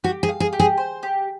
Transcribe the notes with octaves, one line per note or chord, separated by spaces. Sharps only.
F#4 G4
G#4
F5
G#4
G4
G#4
C5
G4